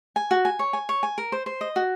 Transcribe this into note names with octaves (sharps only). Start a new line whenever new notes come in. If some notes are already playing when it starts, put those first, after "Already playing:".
G#5
F#4
G#5
C#5
G#5
C#5
G#5
A#4
C5
C5
D#5
F#4